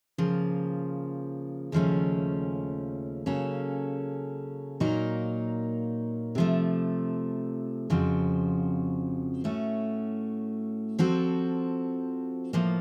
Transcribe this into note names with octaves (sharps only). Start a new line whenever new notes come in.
C#3 F3 A#3
D#2 C#3 F3 A3 C#4
C#3 F#3 A#3 C#4 A4
A#2 F#3 A#3 D#4 A#4
C3 F3 A3
F2 C#3 F3 C4 F#4
A2 A3 C#4 F#4
F3 C4 F#4 A4
A2 F3 A#3